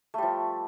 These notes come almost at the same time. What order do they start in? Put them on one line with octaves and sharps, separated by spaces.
A3 G3 F3